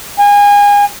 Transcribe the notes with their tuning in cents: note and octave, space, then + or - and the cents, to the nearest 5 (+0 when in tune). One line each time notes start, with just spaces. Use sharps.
G#5 -30